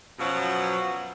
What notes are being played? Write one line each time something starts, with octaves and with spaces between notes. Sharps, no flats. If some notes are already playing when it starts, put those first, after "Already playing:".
F#2 B2 F3 F#3